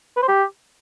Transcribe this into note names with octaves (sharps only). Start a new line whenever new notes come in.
B4
C5
G4